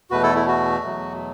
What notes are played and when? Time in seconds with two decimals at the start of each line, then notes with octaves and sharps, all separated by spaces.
0.11 E2 B2 A3 F#4 B4
0.23 E4 A4
0.35 E4
0.47 F#4
0.84 E2 B2 F#3 A3